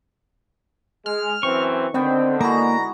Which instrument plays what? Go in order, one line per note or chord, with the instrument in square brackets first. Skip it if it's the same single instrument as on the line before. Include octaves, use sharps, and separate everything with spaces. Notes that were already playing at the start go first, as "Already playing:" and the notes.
[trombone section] G#3 [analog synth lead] F6
[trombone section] F#2 E3 C4 [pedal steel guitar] C#6
[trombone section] D3 [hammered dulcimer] D#3 B3 G5 [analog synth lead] C4
[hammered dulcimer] G#3 E4 F#4 [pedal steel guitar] A#3 [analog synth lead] A#5